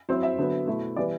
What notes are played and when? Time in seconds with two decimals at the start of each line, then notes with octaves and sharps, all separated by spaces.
0.09 F#3 C4 E4 C5
0.23 E5
0.38 D3 F#3 B3
0.67 B2 A3 E4
0.96 E3 G3 B3 D5